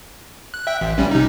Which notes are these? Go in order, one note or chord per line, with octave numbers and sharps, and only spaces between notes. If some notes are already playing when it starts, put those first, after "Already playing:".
F#6
E5 G5
A1
A1 G3 C#4
C3 D#4